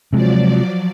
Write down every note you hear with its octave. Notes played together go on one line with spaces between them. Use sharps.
C3 F3 F#3 G#3 D5